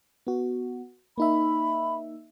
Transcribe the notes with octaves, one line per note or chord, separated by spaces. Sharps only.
B3 F#4
A#3 D#4 E5 B5